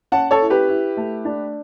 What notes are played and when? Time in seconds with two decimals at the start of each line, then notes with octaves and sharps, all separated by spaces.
0.12 C#4 F#5 A5
0.31 A4 C#5
0.41 E4
0.50 G4 B4
0.68 E4
0.97 A3
1.25 D4